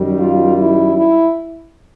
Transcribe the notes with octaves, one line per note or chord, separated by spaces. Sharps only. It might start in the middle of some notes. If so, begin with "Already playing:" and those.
Already playing: F#2 D#3 G3
F4
E4
E4